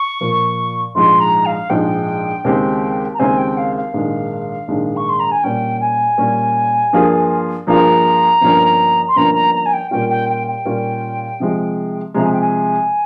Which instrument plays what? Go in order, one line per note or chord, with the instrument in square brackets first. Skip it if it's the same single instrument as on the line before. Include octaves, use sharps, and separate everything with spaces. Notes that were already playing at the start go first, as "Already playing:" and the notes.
Already playing: [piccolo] C#6
[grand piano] A#2 F3 A#3
[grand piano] A#1 G#2 F3 G#3 D#4 [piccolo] C6
[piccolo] A#5
F5
[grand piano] A#1 G#2 F3 G#3 D#4 [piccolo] G5
[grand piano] D#2 C#3 G#3 C4 G4
[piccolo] A#5
[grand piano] D#2 C#3 G#3 C4 G4 [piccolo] G#5
[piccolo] G5
F5
F5
[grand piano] A#1 G#2 D#3 G#3
A#1 G#2 D#3 G#3
[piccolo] C#6
C6
A#5
G#5
[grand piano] A#2 G3 C#4 [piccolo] G5
[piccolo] G#5
[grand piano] A#2 G3 C#4
G2 F3 A#3 F4 G#4
[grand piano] G2 F3 A#3 F4 G#4 [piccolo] A#5
[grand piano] G1 G2 F3 A#3 C#4
[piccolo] C6
[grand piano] G1 G2 F3 A#3 C#4 [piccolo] A#5
[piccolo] A#5
A#5
G#5
G5
[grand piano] A#2 G3 A#3 C#4 F4 [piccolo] G5
[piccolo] G5
G5
G5
[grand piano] A#2 G3 A#3 C#4 F4
C3 F3 G#3
[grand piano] C3 F3 G#3 [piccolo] A#5
[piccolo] G#5
G5
G#5